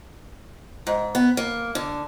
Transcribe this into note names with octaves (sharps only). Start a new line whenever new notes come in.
G#2
B3
A#3
D3